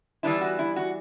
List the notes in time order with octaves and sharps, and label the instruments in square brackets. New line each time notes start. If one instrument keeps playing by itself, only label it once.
[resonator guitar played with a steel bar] E3 G3 B3 D4 E4
F#4
E4
F#4